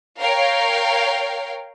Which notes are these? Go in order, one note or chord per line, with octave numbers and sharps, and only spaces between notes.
A#4 C#5 F5 G5